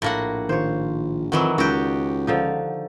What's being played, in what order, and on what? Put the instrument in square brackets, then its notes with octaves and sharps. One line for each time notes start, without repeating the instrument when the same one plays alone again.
[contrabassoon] A#1 [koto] A2 A#3 F#5
[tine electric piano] D#3 F4 [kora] C5 C#5
[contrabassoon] F2 [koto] D#3 E3 F#3 [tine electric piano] F#5
[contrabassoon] C#2 [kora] D#3 [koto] F#4 G4
[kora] D3 F3 D#4